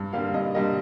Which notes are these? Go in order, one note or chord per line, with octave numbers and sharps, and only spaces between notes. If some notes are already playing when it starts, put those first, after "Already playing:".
Already playing: G2
D3 G3 A#3 F5
G2 D#5
D3 G3 A#3 D#5